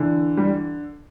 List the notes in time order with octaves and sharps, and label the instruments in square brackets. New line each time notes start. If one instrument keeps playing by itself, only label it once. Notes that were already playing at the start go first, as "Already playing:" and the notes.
Already playing: [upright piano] D3 E3
G3